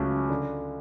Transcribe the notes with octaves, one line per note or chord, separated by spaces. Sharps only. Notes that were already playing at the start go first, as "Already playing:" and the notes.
Already playing: C#2 C#3 F#3 A3 C#4
D3